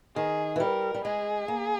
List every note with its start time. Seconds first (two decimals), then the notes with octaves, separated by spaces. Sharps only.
0.16 D#3 G#4
0.56 E3
0.60 G3 A#4
0.94 G3
1.04 G#3 G#4
1.48 A#3